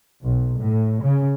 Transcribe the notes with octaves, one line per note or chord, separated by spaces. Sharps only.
B1
A2
C#3